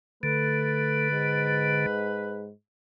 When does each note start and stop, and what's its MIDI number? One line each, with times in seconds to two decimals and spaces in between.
0.23 1.86 50
0.23 1.09 57
0.23 2.45 71
1.11 2.51 44